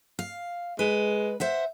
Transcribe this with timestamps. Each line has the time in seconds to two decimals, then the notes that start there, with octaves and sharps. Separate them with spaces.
0.19 F5
0.79 G#3 B4
1.40 C5 E5 F#5